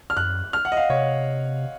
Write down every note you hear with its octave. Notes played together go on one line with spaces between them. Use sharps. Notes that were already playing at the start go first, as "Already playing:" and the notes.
F6
F#2 F#6
F6
F#5
D#5
F5
C3 C#5